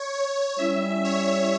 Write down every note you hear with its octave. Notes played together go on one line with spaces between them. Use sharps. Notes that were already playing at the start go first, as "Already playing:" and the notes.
Already playing: C#5
C#5
G3 C#4 E4 E5
C#5